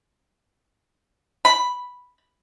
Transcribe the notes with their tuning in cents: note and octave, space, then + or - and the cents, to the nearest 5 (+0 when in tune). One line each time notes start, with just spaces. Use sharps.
B5 +0